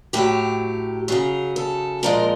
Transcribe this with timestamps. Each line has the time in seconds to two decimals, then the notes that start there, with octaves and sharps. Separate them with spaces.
0.13 A2 F#3 G4
1.08 C#3 F#3 G#4
1.56 A4
2.03 A#2 F3 G#3 A#4